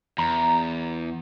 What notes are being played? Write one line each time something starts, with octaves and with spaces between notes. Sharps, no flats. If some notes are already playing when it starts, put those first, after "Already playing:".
E2 A#5